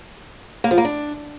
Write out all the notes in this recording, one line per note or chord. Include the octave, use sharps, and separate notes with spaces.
A#3
F3
A#3
D4